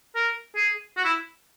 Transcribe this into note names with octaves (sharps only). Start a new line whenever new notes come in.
A#4
G#4
F#4
E4